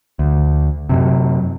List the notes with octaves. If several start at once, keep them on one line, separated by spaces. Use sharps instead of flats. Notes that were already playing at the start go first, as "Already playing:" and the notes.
D2
F#2 C3